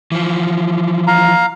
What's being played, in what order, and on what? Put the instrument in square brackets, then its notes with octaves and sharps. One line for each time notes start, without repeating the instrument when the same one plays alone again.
[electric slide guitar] E3 F3
[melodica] F5 A#5